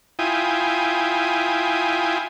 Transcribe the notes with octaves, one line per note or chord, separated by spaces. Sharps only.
E4 F4 G5 G#5 D#6